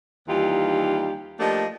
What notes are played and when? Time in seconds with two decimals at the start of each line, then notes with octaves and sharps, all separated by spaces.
0.29 D#2 E3 G3 D#4 F4 G4
1.40 F3 A3 A#3 D4 G4 D#5